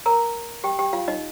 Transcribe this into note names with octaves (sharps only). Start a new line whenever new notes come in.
A#4 A#5
G4 G5
G4 G5
F4 F5
D#4 D#5